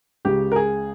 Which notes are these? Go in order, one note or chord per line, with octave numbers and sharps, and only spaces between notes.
C#2 C#3 G4
A#4
G#4